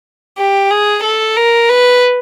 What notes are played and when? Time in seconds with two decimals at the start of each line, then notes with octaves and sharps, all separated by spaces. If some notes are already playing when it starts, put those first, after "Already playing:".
0.38 G4
0.70 G#4
1.03 A4
1.36 A#4
1.69 B4